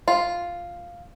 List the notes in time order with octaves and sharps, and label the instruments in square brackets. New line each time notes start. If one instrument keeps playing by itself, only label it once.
[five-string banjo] F4